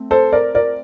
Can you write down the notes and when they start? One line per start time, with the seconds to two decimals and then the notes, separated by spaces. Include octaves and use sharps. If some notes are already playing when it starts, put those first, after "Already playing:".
Already playing: A3 C4
0.11 A4 C5
0.32 A#4 D5
0.55 A#4 D5